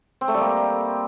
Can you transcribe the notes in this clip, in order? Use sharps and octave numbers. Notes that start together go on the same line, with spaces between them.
C4
A3
G3
A#3